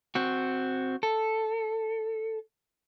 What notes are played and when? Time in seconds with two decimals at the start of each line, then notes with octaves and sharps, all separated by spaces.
0.15 C4 F#4
1.03 A4